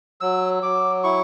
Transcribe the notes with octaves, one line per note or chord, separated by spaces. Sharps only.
F#3 E6
F#3 D6
E4 C#6